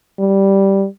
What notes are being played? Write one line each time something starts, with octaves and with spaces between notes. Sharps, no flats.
G3